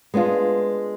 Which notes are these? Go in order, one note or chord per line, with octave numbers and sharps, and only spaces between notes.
G#3 B3 D4 F4